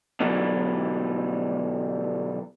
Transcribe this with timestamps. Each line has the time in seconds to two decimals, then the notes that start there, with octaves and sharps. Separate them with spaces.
0.20 B2 D3 E3 F#3 G3